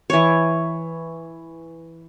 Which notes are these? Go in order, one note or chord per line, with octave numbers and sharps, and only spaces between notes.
E3 C#5